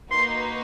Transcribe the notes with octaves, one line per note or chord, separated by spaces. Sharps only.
A#3 D#4 F#4 B4 C6